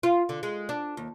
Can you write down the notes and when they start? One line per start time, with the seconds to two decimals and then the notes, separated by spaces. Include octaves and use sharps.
0.03 F4
0.29 D3
0.43 G#3
0.69 D4
0.97 D#2